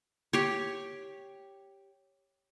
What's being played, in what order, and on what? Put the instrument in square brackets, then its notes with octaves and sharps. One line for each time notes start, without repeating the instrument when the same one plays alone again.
[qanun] G4 C#5